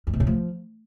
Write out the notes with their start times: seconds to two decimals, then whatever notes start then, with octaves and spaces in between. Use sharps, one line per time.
0.07 F2
0.13 C3
0.20 A2
0.27 F3